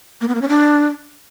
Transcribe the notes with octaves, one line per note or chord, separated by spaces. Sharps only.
A#3
B3
A#3
C#4
D4